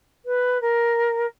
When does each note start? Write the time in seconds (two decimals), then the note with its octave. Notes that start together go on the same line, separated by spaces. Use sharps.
0.25 B4
0.61 A#4